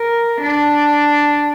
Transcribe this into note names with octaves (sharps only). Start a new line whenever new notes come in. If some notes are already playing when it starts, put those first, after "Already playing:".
Already playing: A#4
D4